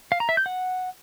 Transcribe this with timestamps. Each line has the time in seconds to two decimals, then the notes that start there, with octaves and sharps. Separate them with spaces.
0.12 F5
0.20 A#5
0.29 E5
0.37 G6
0.46 F#5